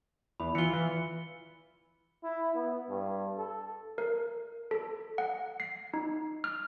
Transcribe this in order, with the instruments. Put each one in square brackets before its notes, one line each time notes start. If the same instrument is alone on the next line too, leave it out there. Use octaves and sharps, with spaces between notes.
[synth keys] E2 [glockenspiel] B5
[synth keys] E3 F4 [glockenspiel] C#7 G7
[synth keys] E3
[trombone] E4
B3
G2
A4
[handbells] A#4
A4
F#5
C7
D#4
F6